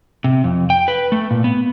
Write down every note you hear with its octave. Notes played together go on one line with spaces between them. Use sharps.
C3
F2
G5
B4
A3
A#2
B3